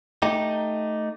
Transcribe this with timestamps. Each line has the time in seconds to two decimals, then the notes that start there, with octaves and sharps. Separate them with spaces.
0.22 A3 D#4 G4